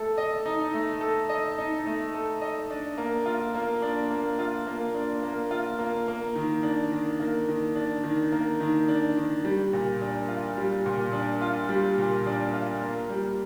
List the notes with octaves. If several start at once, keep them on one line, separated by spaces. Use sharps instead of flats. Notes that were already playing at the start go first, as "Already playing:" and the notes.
Already playing: A3 A4
D#5
D#4
A3
A4
D#5
D#4
A3
A4
D#5
D4
A#3
F4
A#3
D4
A#3
F4
A#3
D4
A#3
F4
A#3
A#3
D#3
D4
D#3
A#3
D#3
D4
D#3
A#3
D#3
D4
D#3
G3
A#2
D4
F4
G3
A#2
D4
F4
G3
A#2
D4
F4
A#3
G3